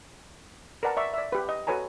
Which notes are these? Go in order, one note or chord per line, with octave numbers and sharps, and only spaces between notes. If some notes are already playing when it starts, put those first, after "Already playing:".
A#4 B4 D5 F#5 A5 A#5
D5 E5 C#6
D5 E5
G4 B4
D#5
F#4 A4 B4 C#5 G#5 A#5